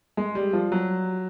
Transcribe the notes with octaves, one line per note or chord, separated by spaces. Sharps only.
G#3
G3
F3
F#3